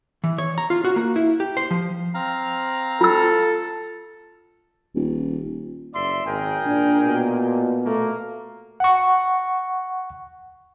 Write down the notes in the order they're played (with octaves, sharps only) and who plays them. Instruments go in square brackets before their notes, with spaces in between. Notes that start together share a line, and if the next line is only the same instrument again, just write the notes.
[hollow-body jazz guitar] E3
C#5
A#5
F4
F#4
A#3
E4
G4
C5
F3
[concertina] C4 F5 A#5
[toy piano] F4 E6 [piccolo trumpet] A4
[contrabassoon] D#1
[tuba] F#1 [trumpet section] D5 E5 C6
[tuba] G#1 [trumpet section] G#4 A#4 G5
[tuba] A#2 [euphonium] D4
[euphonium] B2
[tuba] A3 [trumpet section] A#3
[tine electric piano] F#5 C#6